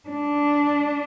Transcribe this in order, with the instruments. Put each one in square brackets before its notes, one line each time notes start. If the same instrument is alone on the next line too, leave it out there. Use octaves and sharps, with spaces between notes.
[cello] D4